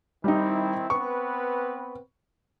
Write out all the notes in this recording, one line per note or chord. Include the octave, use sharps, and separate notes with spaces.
D#3 G3 C4 D#4 E4
B3 C4 B4 C#6